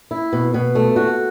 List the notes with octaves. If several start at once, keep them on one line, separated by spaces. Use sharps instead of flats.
E4
B2
B2
A3
F#4